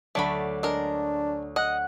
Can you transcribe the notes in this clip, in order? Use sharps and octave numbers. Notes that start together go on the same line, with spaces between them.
D2 F#3 A3 D4 D5 B5
G#3 D4 A#4
D#5 F#5 F#6